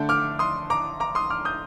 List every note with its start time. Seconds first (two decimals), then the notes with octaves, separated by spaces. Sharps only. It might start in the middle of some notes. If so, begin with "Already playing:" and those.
Already playing: D3 A3 D4 G6
0.09 D6 F6
0.39 C6 D#6
0.70 A#5 D6
1.00 A#5 D6
1.15 C6 D#6
1.30 D6 F6
1.45 D#6 G6